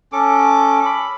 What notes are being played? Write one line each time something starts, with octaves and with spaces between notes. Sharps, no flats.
C#4 A4 D6
B5